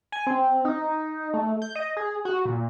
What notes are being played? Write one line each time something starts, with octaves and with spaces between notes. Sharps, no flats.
G#5
C4
D#4
A3
G6
D#5
G#4
F#4
A#2